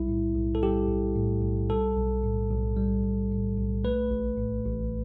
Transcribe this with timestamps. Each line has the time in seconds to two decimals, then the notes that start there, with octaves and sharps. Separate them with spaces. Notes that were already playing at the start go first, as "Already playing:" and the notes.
Already playing: B1 G3 E4
0.08 A2
0.35 B1
0.55 A4
0.62 G3 G4
0.89 B1
1.16 A2
1.42 B1
1.69 G3 A4
1.97 B1
2.23 A2
2.50 B1
2.76 G3
3.04 B1
3.31 A2
3.57 B1
3.84 A3 B4
4.11 A1
4.37 A2
4.65 A1